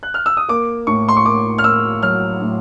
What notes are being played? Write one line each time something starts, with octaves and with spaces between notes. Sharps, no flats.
F#6
F6
E6
D#6
A#3 D6
A2 C#6
C6
C#6
A#3 D6
F6
A#3 E6
F#3 F6
A2